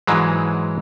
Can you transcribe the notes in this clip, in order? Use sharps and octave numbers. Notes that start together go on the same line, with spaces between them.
G#2 E3 F#3 G#3